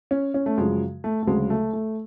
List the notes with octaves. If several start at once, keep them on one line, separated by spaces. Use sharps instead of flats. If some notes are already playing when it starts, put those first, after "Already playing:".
C#4
C#4
A3
F#2 C#3 F3 G#3
A3
A3
D2 C#3 F#3 G#3
A3
A3